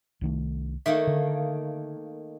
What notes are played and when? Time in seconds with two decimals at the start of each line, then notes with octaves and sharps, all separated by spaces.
0.21 C2 D#3 A3
0.86 D#3 A3 A#3 E5
1.07 D3